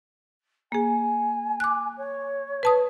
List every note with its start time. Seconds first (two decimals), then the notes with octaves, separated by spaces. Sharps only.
0.72 A#3 G#4 G#5
1.60 D6 F#6
1.97 C#5
2.63 B4 A5 D#6